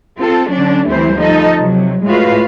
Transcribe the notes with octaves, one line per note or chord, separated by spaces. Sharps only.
C4 F4 A4
D3 F#3 C#4 D4
D2 E3 G3 A3 C4 C5
F3 D#4 A4 D#5
C3 F#3
A2 G#3 F4 F#4 B4 F5